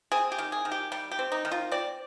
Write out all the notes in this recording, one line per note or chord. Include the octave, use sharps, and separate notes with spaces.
C4 G#4
G4
D#3
G#4
D#3
G4
G3 G4
G4
C4
D#4
D#3
F4
C4 D5